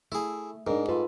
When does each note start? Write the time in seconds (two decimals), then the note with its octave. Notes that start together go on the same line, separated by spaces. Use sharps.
0.12 A3 E4 G#4
0.67 G#2 D4 A#4
0.88 F4 A4 B4